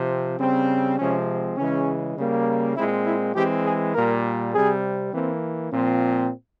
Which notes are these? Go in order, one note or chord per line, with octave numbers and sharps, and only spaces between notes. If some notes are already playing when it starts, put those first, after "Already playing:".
Already playing: C3 F3 C4
C#3 G3 C4
C3 F3 G#3 C4 C#4
C#3 E3 G#3 C#4
C#3 G3 A#3
A#2 G#3 C4 E4
E4
E3 G#3 C4 G4
G#4
A#2 G3 A#3 A#4
C3 G3 C4 G#4
E3 A#3 C4
A#2 F3 C4